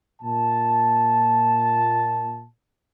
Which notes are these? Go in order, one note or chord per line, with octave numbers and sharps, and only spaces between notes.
A#2 A5